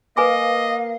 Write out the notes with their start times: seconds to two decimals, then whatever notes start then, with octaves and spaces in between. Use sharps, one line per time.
0.17 A#3 B4 D#5 F5 G#5 D6